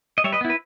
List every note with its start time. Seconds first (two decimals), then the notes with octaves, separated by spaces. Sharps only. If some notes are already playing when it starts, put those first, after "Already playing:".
0.18 D#5
0.24 G3 C#5 E5
0.32 B4 D#5
0.41 B3 E4
0.50 B4